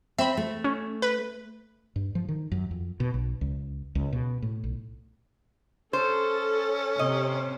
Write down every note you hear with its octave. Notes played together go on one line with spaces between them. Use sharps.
C4 E5 B5
A3
C#4
B4
G2
F3
D#3
F#2
F2
B2
B1
C#2
C#2
B2
A2
B1
C#4 A4 C5
C3 D#5